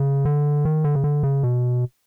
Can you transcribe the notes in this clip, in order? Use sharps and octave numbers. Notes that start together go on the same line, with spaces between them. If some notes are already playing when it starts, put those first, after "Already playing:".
Already playing: C#3
D3
D#3
D3
C#3
D3
C#3
B2